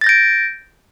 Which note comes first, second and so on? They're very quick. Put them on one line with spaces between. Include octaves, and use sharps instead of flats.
A6 A#6 G6 D7